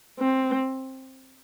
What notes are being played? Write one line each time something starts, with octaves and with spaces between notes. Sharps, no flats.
C4